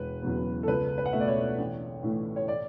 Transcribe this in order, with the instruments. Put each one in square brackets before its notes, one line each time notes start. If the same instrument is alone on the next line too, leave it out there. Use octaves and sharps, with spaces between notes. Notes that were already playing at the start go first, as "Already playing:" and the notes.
Already playing: [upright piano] E1 B4
E2 C#3 F#3 B3
A4
C#2 B4
B4
F#5
B2 A3 E5
D5
C#5
A1
A2 E3 A3
C#5
D5